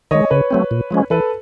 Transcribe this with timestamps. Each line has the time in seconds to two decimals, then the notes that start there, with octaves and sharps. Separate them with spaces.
0.11 D#3 G#3 C#5 D#5
0.31 C#3 B4 C#5
0.51 F#3 A3 C4
0.71 A#2
0.91 F3 G#3 C#4
1.10 E3 A4 B4